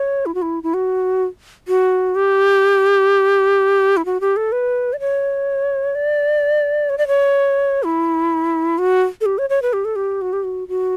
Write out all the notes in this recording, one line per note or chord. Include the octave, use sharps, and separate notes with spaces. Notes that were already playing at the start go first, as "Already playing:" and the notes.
Already playing: C#5
E4
F#4
E4
E4
F#4
F#4
G4
E4
F#4
G4
A4
B4
D5
C#5
D5
C#5
D5
C#5
E4
F#4
A4
G4
C#5
C#5
B4
G4
A4
G4
F#4
G4
F#4
F#4